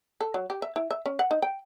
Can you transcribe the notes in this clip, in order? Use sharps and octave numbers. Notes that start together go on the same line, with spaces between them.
A4
F#3
G4
E5
E4
E5
C#4
F#5
D#4
G5